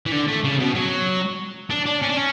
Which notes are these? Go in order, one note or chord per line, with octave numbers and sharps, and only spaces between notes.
E3
D3
A3
C#3
B2
F#3
D4
D4
C#4
D4
C#4